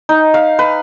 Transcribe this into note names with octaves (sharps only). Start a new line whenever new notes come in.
D#4
F5
B4